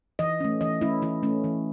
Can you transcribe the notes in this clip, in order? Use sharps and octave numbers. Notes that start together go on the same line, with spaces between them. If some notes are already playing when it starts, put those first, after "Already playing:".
E3 D#5
A3 C#4
E3 D#5
A3 C#4 E4
E3 E4
A3 C#4
E3